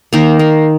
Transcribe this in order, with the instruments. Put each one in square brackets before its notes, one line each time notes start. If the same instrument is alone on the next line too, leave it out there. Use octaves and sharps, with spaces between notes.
[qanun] D#3 A#3 A#4
A#3